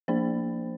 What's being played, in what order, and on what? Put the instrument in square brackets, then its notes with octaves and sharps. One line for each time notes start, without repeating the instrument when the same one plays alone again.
[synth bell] F3 A#3 D4 C5